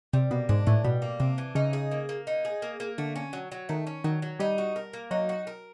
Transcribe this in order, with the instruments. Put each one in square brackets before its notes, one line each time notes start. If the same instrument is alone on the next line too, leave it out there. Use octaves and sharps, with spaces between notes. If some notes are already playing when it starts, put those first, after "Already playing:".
[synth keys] C3 [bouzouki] G3
[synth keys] B2 [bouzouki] A#3
[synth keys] G#2 [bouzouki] D4
[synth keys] A2 [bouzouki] E3
[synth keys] B2 [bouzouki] G3
[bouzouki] A#3
[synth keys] C3 [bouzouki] D4
[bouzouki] E3
[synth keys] C#3 [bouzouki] D#4
[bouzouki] G#4
A#3
A#3
D#4
G#4
A#3
A#3
[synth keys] D3 [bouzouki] A3
[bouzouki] C#4
F#3
F#3
[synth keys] D#3 [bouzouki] A3
[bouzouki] C#4
[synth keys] D#3 [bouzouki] F#3
[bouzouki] F#3
[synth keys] G3 [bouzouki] D#4
[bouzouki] F#4
A#4
A#3
[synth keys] F#3 [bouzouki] D#4
[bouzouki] F#4
A#4